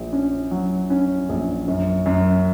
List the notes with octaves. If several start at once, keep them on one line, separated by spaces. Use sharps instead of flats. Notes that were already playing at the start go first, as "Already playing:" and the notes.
Already playing: A#1
C#4
F#3
C#4
A#1
F#2
F#2